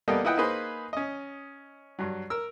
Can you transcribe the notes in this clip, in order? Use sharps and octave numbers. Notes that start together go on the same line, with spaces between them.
G3 A#3 B3 A4 D#5 G5
E4 F4 B4 D#5 F#5 G5
A#3 D#4 G#4 B4 C5
C#4 D#5
G2 F#3
A#4 E6